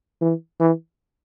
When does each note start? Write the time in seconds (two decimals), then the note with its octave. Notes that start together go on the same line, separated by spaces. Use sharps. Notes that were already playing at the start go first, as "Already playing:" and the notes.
0.22 E3
0.60 E3